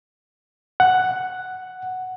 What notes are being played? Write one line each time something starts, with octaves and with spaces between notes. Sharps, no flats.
F#5